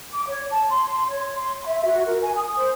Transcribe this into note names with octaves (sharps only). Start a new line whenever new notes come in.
D6
C#5
A5
C6
C#5
C6
E5
F#4
A#4
G#5
D#6
C5